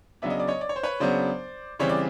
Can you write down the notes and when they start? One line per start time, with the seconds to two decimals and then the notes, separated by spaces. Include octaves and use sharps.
0.22 C#3 F#3 B3 D4 E5
0.30 D#5
0.40 D5
0.48 C#5 D#5
0.61 D5
0.69 C#5
0.76 C5
0.83 B4 C#5
1.00 C#3 F#3 B3 D4 C5 D5
1.79 C#3 E3 G3 C4 C#5
1.89 D5